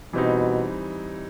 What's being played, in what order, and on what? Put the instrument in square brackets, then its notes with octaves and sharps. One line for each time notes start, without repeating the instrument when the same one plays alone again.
[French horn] B2 [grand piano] E3 G3 C4 D#4